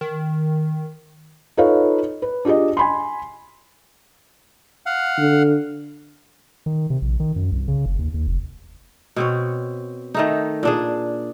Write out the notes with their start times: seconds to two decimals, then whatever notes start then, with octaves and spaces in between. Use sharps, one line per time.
0.01 D#3
1.57 D#4 F4 A4 B4 C#5 F5
2.22 B4
2.45 D4 F4 G4 G#4 D#5
2.77 G#5 B5 C6
4.86 F5 F#5
5.18 D3
6.66 D#3
6.90 C3
7.02 A#1
7.20 D#3
7.36 F#2
7.52 C2
7.68 C#3
7.86 F#1
7.99 D#2
8.14 D#2
8.27 F1
9.16 B2 C4 C#5
10.14 D#3 A3 D#4
10.63 A#2 D4 G#4